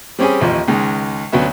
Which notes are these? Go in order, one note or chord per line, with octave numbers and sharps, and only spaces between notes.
G3 C4 C#4 G4 G#4
A1 D#2 F3 D#5
C#2 D#3 G#3
D2 F#3 B3 C#4 E5